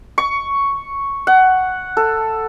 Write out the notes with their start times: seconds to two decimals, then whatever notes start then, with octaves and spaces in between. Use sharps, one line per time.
0.18 C#6
1.27 F#5
1.97 A4